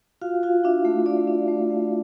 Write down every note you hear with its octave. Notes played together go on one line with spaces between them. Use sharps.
F4 F#4 F5
F4 F#4 F5
D4 E4 E5
A3
D4 D5
D4
A3
A3